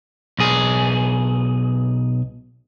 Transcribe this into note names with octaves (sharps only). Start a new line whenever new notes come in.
B1 G#4